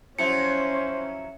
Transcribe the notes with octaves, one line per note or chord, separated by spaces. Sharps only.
F3 F#3 C#4 E4 C5 C#7